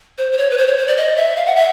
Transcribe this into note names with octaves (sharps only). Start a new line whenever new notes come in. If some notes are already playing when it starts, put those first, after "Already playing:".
C5
C5
C#5
B4
C5
C#5
C5
D5
D#5
E5
F5
F#5
E5